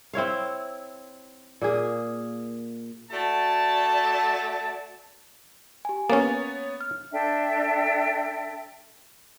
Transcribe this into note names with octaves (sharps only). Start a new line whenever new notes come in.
C4 E4 C#5 F5
A#2 A#3 G#4
A3 F#4 D5 G#5 A5
G4 G#5
A#3 B3 C#4 C#5 A6
F6
D4 A4 E5 G5